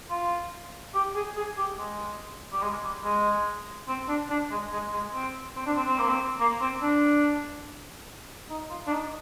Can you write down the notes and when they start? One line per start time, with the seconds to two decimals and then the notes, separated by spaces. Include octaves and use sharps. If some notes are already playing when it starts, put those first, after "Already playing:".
0.10 F4
0.95 G4
1.15 G#4
1.36 G#4
1.57 G4
1.78 G#3
2.52 G3
2.62 G#3
2.84 G3
3.04 G#3
3.88 C4
4.08 D4
4.30 D4
4.51 G#3
4.72 G#3
4.93 G#3
5.14 C4
5.56 C4
5.66 D4
5.77 C4
5.87 C4
5.98 A#3
6.09 C4
6.40 A#3
6.61 C4
6.82 D4
8.50 D#4
8.70 F4
8.87 D4
8.92 D#4